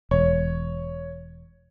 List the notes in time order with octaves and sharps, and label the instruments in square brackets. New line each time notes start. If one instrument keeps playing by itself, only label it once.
[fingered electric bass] E1 [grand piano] C#5